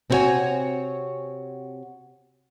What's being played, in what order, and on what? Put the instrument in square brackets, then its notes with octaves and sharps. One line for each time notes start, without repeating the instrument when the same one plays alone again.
[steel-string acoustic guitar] C3 C4 E4 F#4 C#5 G#5